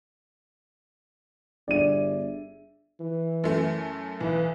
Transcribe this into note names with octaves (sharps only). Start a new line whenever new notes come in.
G1 D4 G#4 D5 E5 D#7
E3
F#2 A3
B1 E3